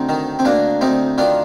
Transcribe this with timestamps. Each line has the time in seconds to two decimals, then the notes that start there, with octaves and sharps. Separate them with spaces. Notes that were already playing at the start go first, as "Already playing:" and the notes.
Already playing: D2 C4 D#4
0.09 D#3
0.39 C4
0.45 D2 A#3 D4
0.81 D2 C4 D#4
1.18 D#3 D4 F4